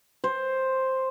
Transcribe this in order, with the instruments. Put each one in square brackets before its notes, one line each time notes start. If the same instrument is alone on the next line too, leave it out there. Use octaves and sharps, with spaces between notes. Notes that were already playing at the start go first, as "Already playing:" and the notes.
[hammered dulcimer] C5